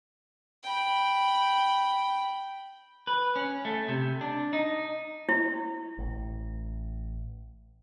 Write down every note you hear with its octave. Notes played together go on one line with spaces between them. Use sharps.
G5 B5
B4
C#4
A3
C3
D4
D#4
E4
A1